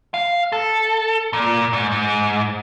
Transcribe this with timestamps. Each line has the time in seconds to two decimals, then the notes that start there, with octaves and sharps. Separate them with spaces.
0.14 F5
0.52 A4
1.33 A#2
1.73 G#2
1.92 G#2